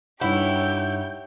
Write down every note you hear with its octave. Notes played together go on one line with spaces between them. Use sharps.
G2 D#4 E4 G4 C#5 F#5 G6